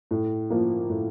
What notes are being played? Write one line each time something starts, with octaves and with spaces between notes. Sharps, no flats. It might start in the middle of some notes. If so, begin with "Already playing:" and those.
A2
F3 A#3
A2